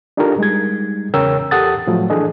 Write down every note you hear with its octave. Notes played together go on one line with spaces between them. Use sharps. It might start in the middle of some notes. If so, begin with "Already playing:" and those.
D4 D#4 F4 G4 A4 A#4
G3 G#3 D#4 G#6
E2 C#3 A#4 C#5 G5 E6
E2 G4 A4 F#5 D#6 A6
A2 F3 F#3 A3
E3 D4 G#4 A4 D#5